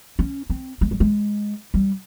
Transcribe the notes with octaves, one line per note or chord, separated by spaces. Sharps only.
C#4
C4
G#3
G3
G#3
G3